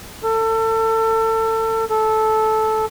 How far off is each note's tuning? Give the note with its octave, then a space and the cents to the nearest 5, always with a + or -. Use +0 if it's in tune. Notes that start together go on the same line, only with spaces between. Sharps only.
A4 +30
A4 -10